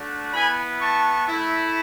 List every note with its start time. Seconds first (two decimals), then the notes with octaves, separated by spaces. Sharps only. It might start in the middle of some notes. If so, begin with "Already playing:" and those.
Already playing: A3 D4 F#4
0.33 B3 E4 G#5 B5
0.80 A5 C#6
1.28 A3 E4